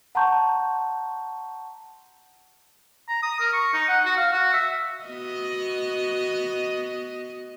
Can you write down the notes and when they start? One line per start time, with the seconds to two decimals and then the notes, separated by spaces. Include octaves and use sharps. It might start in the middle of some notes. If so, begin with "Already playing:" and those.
0.15 F#5 A5 A#5 C6 C#6 G6
3.09 A#5
3.23 D#6
3.40 A#4
3.53 C#6
3.74 D#4
3.88 F#5
4.05 F#4
4.17 F5
4.32 F#4
4.53 E5
5.04 B3 F#4 D#5